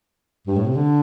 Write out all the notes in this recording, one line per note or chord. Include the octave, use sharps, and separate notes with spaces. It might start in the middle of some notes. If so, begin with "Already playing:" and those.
G2
A2
C3
D3